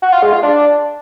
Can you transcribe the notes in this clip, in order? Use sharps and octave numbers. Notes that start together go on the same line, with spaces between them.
F#4
F4
G#3
F4
D4